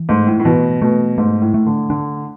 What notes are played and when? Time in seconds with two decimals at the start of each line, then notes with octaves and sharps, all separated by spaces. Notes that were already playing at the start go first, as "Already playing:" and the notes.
Already playing: E3
0.09 G#2 A3
0.27 A2
0.40 A2
0.45 B2 E3
0.82 B2 A3
1.18 G#2 A3
1.41 A2
1.54 A3
1.66 D3
1.90 D3 D4